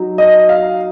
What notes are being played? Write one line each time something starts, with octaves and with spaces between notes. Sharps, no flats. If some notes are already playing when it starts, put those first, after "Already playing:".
Already playing: F#3 D#4
D#5
F5